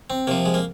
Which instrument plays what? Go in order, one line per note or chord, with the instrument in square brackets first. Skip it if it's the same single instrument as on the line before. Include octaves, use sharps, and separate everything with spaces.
[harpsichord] C4
C3 F3 A#3
G#3
A#3